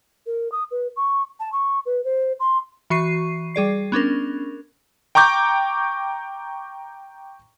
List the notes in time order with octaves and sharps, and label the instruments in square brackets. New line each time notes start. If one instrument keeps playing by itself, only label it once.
[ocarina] A#4
D#6
B4
C#6
A5
C#6
B4
C5
C6
[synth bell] E3 F#4 C#6 C7 D#7
G3 G#4 D5 C7
B3 C#4 D4 A#4
[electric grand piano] G5 A#5 C#6 D6 G6